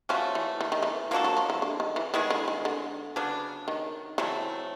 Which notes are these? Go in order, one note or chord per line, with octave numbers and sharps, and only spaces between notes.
F3 A3 C#4 F#4
E3
E3
D#3
E3
F3 A#3 D4 F#4 A4
F#3
F3
E3
D3
D#3
E3
D#3 G#3 B3 E4 G#4
D3
D#3
D3
C#3 F#3 B3 D4
D#3
C#3 E3 F#3 A3 C4